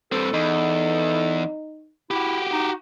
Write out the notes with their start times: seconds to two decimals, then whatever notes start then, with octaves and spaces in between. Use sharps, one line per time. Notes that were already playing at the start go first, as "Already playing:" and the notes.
0.12 G2 C4 A4
0.34 E2 D#4
2.11 E4 F#4 G4
2.52 D#4